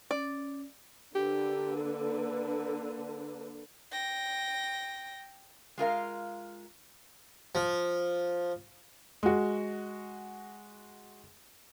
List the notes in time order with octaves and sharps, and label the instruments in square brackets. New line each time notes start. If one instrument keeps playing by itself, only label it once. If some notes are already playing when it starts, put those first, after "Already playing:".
[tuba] C#4 [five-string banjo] D5
[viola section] D3 A#3 B4 [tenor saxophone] G4
[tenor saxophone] A4
[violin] G5 A#6
[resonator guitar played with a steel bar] G#3 F4 A#4 F5
[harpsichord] F3
[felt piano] G#3 F#4